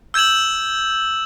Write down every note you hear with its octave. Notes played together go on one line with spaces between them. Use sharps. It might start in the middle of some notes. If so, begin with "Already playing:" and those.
E6 G6 G#6 E7 F#7